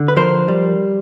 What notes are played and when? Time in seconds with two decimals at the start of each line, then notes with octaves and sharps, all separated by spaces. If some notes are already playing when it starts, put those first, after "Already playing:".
Already playing: D3
0.08 B4
0.16 F3 A#4 C5
0.48 G3